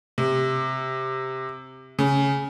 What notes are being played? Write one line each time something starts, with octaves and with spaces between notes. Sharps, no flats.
C3
C#3